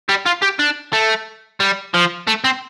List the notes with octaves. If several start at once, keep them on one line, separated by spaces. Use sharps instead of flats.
G3
F4
G4
D4
A3
G3
F3
A3
C4